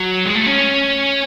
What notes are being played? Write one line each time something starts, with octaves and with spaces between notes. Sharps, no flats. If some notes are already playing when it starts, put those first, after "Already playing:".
Already playing: F#3
G#3
A3
C#4